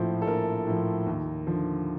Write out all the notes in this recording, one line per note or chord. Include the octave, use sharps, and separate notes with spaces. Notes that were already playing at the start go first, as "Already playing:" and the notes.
Already playing: A#1 A2 F3 C5
A4
A#1 A#4
A2 F3
D#2
D3 F3